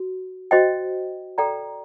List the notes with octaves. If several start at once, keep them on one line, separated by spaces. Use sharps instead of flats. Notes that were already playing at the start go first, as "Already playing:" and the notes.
Already playing: F#4
F#4 C5 D#5 G5
A4 D5 G5 A#5